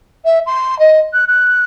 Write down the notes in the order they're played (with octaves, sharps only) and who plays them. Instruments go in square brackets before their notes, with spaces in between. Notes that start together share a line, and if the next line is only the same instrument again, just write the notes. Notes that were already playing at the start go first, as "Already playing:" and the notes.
[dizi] E5
C6
D#5
F#6
F#6